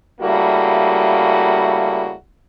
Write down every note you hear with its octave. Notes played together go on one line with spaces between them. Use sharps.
C#3 G3 A3 A#3 E4 F#4